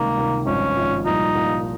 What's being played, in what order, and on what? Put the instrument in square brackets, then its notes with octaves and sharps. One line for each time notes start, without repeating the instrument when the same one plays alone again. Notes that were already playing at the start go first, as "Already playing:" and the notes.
Already playing: [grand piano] C#2 C3 D#3 G3 [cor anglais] A#3
[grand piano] C#2 C3 D#3 G3
[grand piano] G#1 G2 F3 [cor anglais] C#4
[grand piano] G#1 G2 F3
[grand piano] C2 A#2 F3 [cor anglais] D#4
[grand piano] C2 A#2 F3